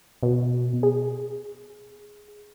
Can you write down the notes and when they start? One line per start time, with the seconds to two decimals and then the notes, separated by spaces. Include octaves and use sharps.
0.23 B2
0.83 G#4